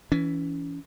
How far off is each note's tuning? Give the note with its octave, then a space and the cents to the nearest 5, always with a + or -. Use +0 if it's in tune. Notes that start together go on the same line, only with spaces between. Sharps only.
E3 +5 C#4 +30